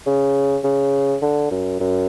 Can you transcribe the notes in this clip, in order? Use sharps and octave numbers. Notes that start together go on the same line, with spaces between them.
C#3
C#3
D3
F#2
F#2